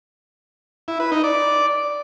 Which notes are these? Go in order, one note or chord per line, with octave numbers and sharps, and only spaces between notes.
E4
B4
D#4
D5